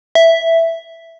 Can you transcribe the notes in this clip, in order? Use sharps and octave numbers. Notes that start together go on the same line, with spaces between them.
E5